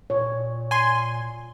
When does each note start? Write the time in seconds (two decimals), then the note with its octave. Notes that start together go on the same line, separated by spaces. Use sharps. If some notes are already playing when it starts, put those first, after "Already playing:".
0.10 A#2 C#5
0.71 G#5 C6